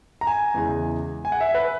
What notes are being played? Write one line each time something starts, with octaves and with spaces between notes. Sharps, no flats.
A#5
G#5
E2 C#3 E3 G#3
G#5
F#5
E5
B4